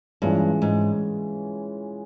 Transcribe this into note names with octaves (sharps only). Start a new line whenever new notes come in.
G2 E3 G#3 C#4 F4
G#2